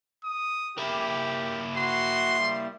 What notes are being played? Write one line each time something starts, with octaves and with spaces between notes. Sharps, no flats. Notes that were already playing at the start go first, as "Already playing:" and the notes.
D#6
A#3 E4 G4
F#4 C6
G3